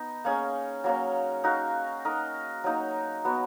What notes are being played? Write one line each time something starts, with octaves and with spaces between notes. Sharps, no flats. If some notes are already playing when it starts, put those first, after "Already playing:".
Already playing: B3 D#4 D#5
A#3 C#4 G#4
F#3 A#3 C#4
D#4 F#4 A#4 F5
D#4 A#4 D#5
F#3 A#3 D#4
F#3 B3 F#4